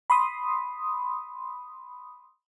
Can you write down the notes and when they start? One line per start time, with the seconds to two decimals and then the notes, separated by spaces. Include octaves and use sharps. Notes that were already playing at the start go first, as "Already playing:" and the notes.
0.10 B5 C6 D#6